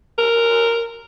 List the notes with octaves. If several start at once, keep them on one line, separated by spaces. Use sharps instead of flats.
A#4